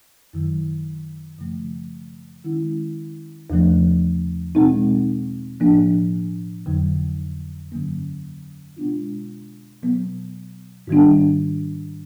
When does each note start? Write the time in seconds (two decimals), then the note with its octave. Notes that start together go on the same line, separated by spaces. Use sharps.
0.33 F#2 D#3 F#3
1.39 F#2 C#3 F3 A3
2.44 D#3 G#3 C#4 E4
3.50 E2 C#3 F3 A3
4.55 B2 G#3 C4 D#4
5.60 A2 F3 A#3 D4
6.66 F2 D3 F#3
7.71 G2 D3 F#3 A#3 C#4
8.76 B2 G#3 B3 D4 F4
9.83 B2 F#3 B3
10.87 G#2 D#3 G3 B3 D4